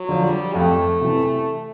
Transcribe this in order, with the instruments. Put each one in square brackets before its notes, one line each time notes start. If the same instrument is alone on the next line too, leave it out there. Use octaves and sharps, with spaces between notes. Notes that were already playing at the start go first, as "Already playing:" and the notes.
Already playing: [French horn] F#3
[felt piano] D3 F3
[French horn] G3
[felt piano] F2 [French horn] A3
[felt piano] C3 E3